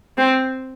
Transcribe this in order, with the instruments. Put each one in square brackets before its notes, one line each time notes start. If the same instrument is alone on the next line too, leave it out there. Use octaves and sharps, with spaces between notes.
[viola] C4